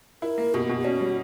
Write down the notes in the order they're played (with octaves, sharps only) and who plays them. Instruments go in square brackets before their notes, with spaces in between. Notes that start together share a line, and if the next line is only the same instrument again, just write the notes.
[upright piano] E4 [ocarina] A#4
[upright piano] A#3
[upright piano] B2 [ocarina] G4
[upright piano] B2
[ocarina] G4
[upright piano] C#4 [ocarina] F#4
[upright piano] G3